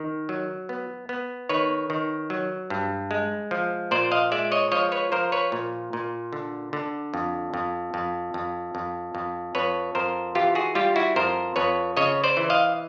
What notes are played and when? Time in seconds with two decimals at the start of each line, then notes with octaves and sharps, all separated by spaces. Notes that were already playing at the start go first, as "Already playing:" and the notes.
Already playing: D#3
0.29 F#3
0.69 B3
1.09 B3
1.49 D#3 B4 C#5
1.90 D#3
2.30 F#3
2.70 G2
3.11 G#3
3.51 F3
3.91 A#2 C5 D5
4.12 D#5 F5
4.32 G#3 D5 E5
4.52 C#5 D#5
4.72 F3 C#5 D#5
4.92 B4 C#5
5.12 F3 A#4 C5
5.32 B4 C#5
5.52 A#2
5.93 A#2
6.33 D3
6.73 D3
7.14 F2
7.54 F2
7.94 F2
8.34 F2
8.75 F2
9.15 F2
9.55 F2 B4 C#5
9.95 F2 A#4 C5
10.35 E3 F4 G4
10.55 F#4 G#4
10.75 G3 F4 G4
10.96 E4 F#4
11.16 F2 A#4 C5
11.56 F2 B4 C#5
11.97 C#3 C#5 D#5
12.24 C5 D5
12.37 E3
12.50 D#5 F5